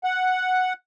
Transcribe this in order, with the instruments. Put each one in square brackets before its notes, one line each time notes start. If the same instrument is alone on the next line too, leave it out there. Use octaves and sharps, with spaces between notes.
[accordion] F#5